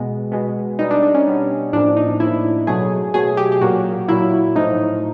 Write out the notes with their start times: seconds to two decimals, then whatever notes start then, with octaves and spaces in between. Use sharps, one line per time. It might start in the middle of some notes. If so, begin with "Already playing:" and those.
Already playing: B2 G#3 B3
0.32 B2 G#3 B3
0.79 B2 G3 B3 D#4
0.91 D4
1.03 D4
1.15 C#4
1.26 B2 G3 B3
1.73 A2 F3 A#3 D4
1.96 D#4
2.20 A2 F3 A#3 E4
2.67 B2 F#3 A3 G#4
3.14 B2 F#3 A3 G#4
3.37 G4
3.52 G4
3.61 A#2 F#3 A#3 F#4
4.08 A#2 F#3 A#3 E4
4.55 A2 F3 A3 D#4